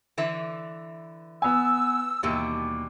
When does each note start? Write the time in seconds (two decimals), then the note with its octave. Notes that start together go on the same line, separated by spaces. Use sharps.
0.18 D3 E3 E5
1.42 B3 G#5 E6
2.23 D#2 B2 E3 G3